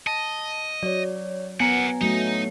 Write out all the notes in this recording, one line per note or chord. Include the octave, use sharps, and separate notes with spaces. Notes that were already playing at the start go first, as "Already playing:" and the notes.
D#5 A5
F#3 C#5 D5
B3 A#4 F#5 G#5 A#5
F#3 A3 D#4